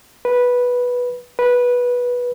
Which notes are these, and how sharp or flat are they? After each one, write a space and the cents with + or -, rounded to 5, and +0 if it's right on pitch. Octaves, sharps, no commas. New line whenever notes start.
B4 -10
B4 -15